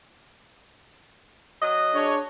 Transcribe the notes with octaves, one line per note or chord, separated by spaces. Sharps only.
F#3 D#5
D4 G#4 C#5